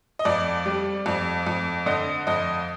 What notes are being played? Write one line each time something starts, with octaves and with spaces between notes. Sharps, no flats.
D#5
F2 D5
G3
F2
F2
D3 D#5
F2 D#5